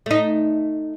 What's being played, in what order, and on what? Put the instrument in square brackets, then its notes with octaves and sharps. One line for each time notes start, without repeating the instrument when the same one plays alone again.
[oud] A3 D#4